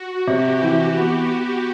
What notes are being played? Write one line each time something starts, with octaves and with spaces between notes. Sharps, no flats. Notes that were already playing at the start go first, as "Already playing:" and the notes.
Already playing: F#4
C3 G4
E3
B3